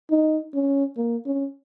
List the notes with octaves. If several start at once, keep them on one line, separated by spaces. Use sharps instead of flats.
D#4
C#4
A#3
C#4